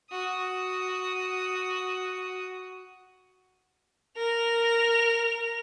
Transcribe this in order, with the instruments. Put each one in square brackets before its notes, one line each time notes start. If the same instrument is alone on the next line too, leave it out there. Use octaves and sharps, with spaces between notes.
[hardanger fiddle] F#4 D#6
[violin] A#4 F7